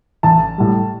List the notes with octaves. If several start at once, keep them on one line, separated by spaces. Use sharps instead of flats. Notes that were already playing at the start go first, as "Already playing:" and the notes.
A1 A5
A2 G3